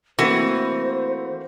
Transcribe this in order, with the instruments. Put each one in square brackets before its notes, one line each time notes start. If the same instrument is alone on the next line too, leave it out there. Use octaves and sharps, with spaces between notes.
[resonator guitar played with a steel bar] E3 [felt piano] A3 A#3 C4 [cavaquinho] F#4 [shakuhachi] C5